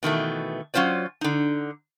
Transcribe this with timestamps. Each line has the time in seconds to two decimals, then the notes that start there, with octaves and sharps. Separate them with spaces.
0.03 B2 D#3 E3 A3
0.74 F#3 C#4 F4 C5 D5
1.21 D3 D#4